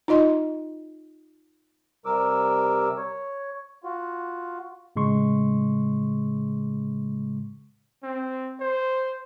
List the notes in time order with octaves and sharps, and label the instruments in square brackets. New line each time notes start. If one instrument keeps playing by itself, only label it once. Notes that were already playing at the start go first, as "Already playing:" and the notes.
[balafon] D#4 F4 D#5 C6
[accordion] C3 G3 A#4 D6 E6
C#5
F4 F#4
[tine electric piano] A2 C#3 G#3 C6 C#6
[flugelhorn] C4
C5